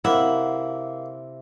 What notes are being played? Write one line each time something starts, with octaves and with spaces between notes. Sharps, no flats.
C3 A#3 E4 F#5